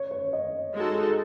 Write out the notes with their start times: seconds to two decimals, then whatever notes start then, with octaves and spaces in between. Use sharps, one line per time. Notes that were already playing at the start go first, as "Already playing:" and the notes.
Already playing: C#5
0.11 C#5
0.33 D#5
0.74 G#3 D#4 F#4 A4